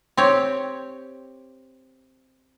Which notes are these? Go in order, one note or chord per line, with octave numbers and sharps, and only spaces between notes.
C4 G4 C#5